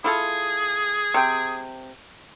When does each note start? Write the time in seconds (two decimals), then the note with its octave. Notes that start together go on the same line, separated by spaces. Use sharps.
0.04 E4 F4 G#4 A4
1.14 C3 G5